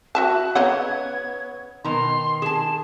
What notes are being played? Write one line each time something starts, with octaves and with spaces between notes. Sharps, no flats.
F#4 E5 A5 F#6
C#3 B3 D#4 C#5 F#5 G#6
B2 D#3 A#5 C6
G#4 A5 E7